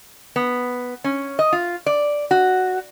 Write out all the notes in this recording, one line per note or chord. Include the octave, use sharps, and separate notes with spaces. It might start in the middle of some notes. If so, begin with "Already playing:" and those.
B3
C#4
D#5
F4
D5
F#4